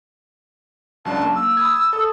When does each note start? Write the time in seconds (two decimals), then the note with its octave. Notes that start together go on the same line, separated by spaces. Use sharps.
1.05 C#2 F#3 D4 A5
1.23 A#3
1.35 E6
1.57 B5 D#6 G#6
1.93 A4